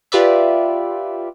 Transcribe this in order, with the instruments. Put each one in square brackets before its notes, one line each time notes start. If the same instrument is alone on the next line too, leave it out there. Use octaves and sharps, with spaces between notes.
[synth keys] F4 G4 B4 D5 E5